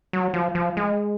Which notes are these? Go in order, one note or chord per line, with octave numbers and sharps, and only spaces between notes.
F#3
F3
F3
G#3